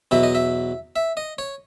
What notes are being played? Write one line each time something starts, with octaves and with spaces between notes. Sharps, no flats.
E2 B2 F#3 E5
D#5
E5
E5
D#5
C#5